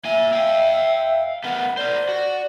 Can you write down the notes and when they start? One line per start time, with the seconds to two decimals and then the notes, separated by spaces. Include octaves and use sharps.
0.05 A#3 E5 G#5
0.33 F5 G5
1.44 A3 B3 A#4 F#5
1.77 A#4 C5 D5
2.09 F#4